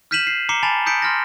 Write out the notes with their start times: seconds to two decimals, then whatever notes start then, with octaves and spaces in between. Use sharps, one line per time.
0.11 F6 G6 B6 D#7 E7 F#7
0.27 C7
0.49 A#5 D6 C7 C#7 E7 G7
0.63 G#5 A5 B5 A6 E7 F7
0.86 D#6 G6 B6 C#7 D7
1.02 C6 F6 A6 A#6